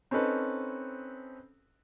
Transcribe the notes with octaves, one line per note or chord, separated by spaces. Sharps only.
C4 C#4 D#4 A4 B4